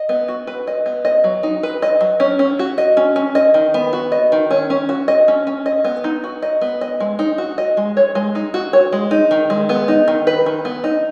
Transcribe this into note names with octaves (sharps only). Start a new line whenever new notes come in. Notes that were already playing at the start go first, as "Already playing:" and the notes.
Already playing: D#5
B3
F#4
B4
D#5
B3
D#5
F#3
D#4
B4
D#5
F#3
C#4
C#4
F#4
D#5
C#4
C#4
D#5
D#3
B3
F#4
D#5
D#3
C#4
C#4
F#4
D#5
C#4
C#4
D#5
B3
D#4
F#4
D#5
B3
D#5
G#3
D#4
F#4
D#5
G#3
C#5
G#3
D#4
F#4
C#5
G#3
D#4
D#3
G#3
B3
D#4
D#3
B4
D#3
B3
D#4